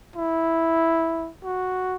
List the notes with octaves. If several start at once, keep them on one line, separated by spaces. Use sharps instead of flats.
E4
F#4